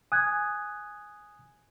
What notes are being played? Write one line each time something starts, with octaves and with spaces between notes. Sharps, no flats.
G#5 D#6 F#6 G#6